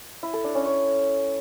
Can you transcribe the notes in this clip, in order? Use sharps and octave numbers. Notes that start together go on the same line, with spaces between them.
E4
A4
D4
C#4
C#5